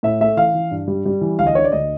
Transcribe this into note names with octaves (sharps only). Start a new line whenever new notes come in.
A2 E5
A3 E5
E3 F5
E3
G2
G3
G3
E3
D2 F5
D#5
D3 C#5
D5
D2 D#5